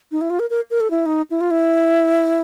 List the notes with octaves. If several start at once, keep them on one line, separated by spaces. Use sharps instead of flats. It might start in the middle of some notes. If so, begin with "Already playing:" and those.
D#4
E4
F4
A#4
A#4
A#4
A4
E4
D#4
E4
F4
E4